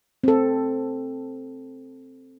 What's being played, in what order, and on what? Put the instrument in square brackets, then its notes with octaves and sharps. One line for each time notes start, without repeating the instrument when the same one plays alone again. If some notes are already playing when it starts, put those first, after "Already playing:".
[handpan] C4 A4